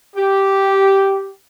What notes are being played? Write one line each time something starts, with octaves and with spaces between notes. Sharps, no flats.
G4